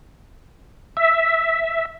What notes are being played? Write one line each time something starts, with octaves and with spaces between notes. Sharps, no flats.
E5